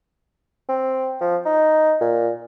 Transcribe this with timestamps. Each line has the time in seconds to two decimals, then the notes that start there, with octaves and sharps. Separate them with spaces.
0.69 C4
1.21 F3
1.46 D#4
2.01 A#2